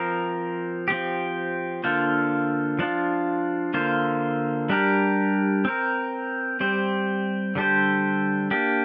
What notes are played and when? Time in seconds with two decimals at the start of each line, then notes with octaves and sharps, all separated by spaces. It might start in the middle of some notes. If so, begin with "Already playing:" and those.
Already playing: F3 C4 A#4
0.88 F3 C4 G4
1.84 D3 A#3 D4 F4 C5
2.79 F3 D4 F4
3.74 D3 A#3 F4 C5
4.69 G3 D4 G4 A#4
5.65 C4 A#4
6.60 G3 C4 G4 C5
7.55 D3 G3 D4 G4 C5
8.51 A#3 D4 G4